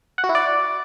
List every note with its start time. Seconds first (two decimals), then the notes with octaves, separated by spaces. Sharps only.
0.18 F#5
0.24 F#4
0.29 E4
0.35 D5